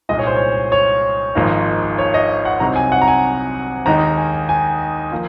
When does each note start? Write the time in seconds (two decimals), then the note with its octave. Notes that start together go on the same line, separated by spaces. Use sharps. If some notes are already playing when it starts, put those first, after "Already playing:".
0.09 C2 A#2 G#3 D#4 D#5
0.19 C#5
0.27 C5
0.36 C#5
0.72 C#5
1.35 G#1 G#2 F3 A#3 D#4
1.98 C#5
2.14 D#5
2.45 F#5
2.60 C2 C3 F#3 C4 D#4 A#5
2.76 G#5
2.92 F#5
3.02 A#5
3.08 G#5
3.86 D#2 D#3 G#3 D#4 A#5
4.17 G#5
4.49 G#5
5.12 F3 A#3